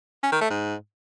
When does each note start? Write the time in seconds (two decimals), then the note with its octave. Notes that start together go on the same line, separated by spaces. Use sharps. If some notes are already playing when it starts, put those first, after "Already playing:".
0.23 C#4
0.32 D#3
0.41 A3
0.50 G#2